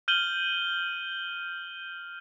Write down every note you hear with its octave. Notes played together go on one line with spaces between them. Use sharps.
F6 G6 D#7 F#7 G7